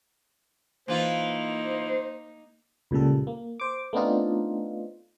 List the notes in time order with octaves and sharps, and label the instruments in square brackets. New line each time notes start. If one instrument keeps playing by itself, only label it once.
[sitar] E3 F4 [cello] A#3 D#4 [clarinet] C5
[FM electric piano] C#2 A#2 C#3 G3 A4
A#3
C5 D6
A3 B3 C4 D4 D#4 F4